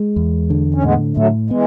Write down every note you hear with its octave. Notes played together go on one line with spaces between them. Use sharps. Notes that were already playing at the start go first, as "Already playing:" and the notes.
Already playing: G#3
E2
D3
C#4
A2 G#3 B3
A2 F#3 A3
E3 G#3 B3